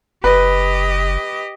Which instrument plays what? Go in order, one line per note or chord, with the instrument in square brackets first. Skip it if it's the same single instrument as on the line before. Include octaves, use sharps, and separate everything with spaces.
[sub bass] F#1 [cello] G4 D#5 [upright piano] B4